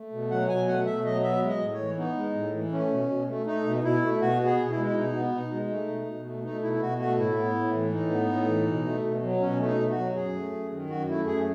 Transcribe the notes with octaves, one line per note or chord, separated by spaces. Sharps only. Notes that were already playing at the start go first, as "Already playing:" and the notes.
Already playing: A3
B2
F#3 F#5
B2 G#5
A3 F#5
B2 E5
F#3 D#5
B3 E5
G#3
D#5
A2
C#5
E3
B3 D#4
G#3
A2
E3
A3 C#4
B2
B2
A3
A3 D#4
B2
B2 E4
A3
B2 F#4
B3
G#4
B2
E4
G#3
E4
B2 D#4
B3
B2 D#4
G#3
A3 D#4
B2
B2
A3
A3 D#4
B2 E4
E4
B2 F#4
A3 F#4
A2 E4
B3
A2
E3
A2 D#4
B3
A2
E3
B2
A3
B2
F#3
B2 C#4
A3
D#4
B2
F#4
F#3
F#2 G#4
A3
F#2
D#3
F#2 F#4
A3 E4
F#2 G#4